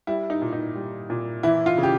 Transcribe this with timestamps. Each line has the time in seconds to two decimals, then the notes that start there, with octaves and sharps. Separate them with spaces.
0.07 G3 E4
0.30 D#4
0.42 A#2
0.53 D#4
0.75 G3
1.10 A#2
1.43 E3 E4
1.66 F4
1.78 C#3
1.83 G4